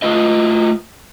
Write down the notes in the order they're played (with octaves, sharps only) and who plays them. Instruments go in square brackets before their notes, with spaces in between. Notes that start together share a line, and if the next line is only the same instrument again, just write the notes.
[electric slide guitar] A3 F4 B4 D#5